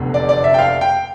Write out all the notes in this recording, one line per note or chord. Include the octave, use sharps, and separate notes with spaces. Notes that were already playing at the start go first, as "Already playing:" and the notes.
Already playing: F1 E2 D3
D5
D5
E5
G5
F5
G5